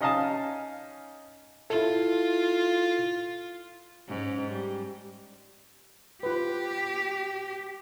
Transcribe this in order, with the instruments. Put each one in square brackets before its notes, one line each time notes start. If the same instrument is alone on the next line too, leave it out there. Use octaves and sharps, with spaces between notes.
[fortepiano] C#4 D#4 D#5 F5 G#5 A5
[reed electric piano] E4 A4 [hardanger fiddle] F4
[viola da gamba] G#2 C#4
G3
[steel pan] F4 B4 [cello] G4